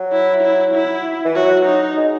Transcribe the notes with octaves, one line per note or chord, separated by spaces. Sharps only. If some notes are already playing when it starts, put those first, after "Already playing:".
Already playing: F#3
E4
E4
E4
E3
F#3 F#4
D#4
G#3